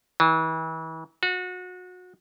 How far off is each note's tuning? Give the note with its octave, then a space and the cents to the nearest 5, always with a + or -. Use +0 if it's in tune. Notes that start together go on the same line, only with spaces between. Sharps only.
E3 -35
F#4 -30